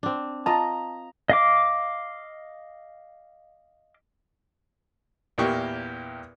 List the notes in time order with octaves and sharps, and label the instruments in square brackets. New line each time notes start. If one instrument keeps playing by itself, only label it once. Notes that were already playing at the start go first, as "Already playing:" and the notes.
[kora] C4 D4
[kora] F4 D#5 [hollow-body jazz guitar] A5 [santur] A#5
[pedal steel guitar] D#5 F5 D6
[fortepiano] E2 A#2 A#3 E4 G4 C#6